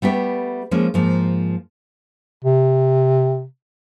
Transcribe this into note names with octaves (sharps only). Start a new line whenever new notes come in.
G3 A3 B3 G4
F3 G#3 A#3 C#4
G#2 F3 A#3
C3